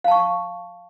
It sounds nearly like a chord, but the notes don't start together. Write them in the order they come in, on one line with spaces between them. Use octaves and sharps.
F5 A5 C#6